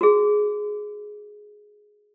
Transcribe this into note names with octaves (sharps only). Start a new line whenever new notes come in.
F#4 G#4